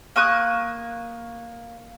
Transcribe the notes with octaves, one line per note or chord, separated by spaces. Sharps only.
A#3 C#6 D#6 F#6